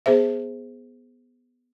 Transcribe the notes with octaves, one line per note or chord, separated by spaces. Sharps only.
B3 G#4 C5 E5